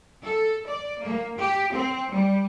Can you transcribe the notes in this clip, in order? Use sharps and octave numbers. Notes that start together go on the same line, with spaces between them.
A4
D5
A#3
G4
C4
G3